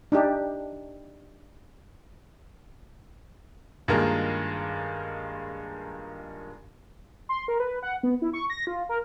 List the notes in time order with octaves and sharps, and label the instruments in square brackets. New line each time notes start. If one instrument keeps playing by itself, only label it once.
[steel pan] D4 D#4 G4
[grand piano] G2 D#3 G#3 A#3 F4
[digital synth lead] C6
A#4
B4
F#5
B3
E4
C#6
A#6
F4
A#4